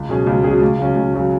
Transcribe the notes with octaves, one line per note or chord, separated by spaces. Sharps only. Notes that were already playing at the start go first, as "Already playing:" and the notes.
Already playing: C#2
B2 F#3 C#4 G#4
C#2
B2 F#3 C#4 G#4
C#2
C#3 F#3 C#4
C#2
C#3 F#3 C#4